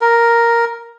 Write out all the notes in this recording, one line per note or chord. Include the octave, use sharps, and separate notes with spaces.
A#4